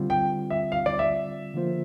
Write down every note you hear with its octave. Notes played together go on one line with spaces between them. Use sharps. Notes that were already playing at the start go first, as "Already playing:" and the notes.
Already playing: D3 G3 C4 F4
G5
E5
F5
D5
E5
D3 F3 A#3 F4 C5